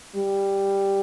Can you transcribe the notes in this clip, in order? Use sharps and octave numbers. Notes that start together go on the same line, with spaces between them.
G3